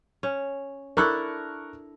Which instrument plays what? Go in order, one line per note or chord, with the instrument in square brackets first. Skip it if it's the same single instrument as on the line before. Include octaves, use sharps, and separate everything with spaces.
[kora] C#4
[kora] D4 E4 A4 [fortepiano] A#4 C#6 F#6